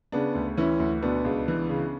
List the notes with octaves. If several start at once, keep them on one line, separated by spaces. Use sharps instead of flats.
C#3 B3 D4
D2
E3 C#4 E4
D2
B2 B3 D4
C#2
E3
C#3